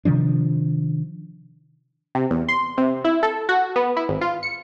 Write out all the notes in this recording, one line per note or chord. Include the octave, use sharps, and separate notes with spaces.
C3 D#3 F3 D4
C3
E2
C6
C3
E4
A4
F#4
B3
E4
G#1
F4
C#7